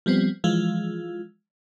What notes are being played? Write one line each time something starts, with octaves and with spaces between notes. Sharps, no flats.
F3 G3 B3 C4
E3 F3 G#3 F4